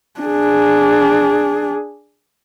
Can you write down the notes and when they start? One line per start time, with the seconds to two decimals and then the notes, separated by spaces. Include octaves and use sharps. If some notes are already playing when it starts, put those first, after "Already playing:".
0.20 D4 G#4